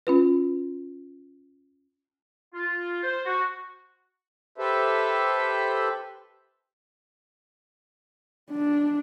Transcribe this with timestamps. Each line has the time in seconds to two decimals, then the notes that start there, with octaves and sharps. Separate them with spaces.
0.07 C#4 F4 B4
2.54 F4
3.03 C5
3.26 F#4
4.58 G4 A4 B4 C5 E5
8.51 D4